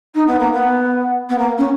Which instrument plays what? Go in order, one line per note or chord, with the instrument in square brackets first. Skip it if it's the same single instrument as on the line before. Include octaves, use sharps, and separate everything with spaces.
[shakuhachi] D#4
B3
A#3
B3
B3
A#3
C#4